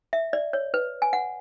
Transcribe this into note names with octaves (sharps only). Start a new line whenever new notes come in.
E5
D5
C#5
B4
G#5
F#5